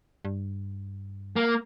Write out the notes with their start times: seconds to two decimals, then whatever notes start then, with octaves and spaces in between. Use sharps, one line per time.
0.25 G2
1.36 A#3